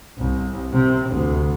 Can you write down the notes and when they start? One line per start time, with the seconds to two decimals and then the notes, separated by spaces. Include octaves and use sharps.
0.17 C2
0.73 C3
1.10 D2